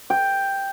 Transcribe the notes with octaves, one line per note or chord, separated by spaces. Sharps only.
G5